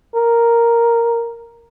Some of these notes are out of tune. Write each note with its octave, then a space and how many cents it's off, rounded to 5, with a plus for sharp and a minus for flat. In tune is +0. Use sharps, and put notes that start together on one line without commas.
A#4 +0